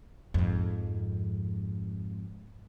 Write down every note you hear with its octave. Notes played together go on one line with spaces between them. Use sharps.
F2 G#2